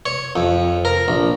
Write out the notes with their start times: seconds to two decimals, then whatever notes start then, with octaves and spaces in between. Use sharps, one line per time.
0.06 C#5
0.36 F2
0.85 A#4
1.08 A#1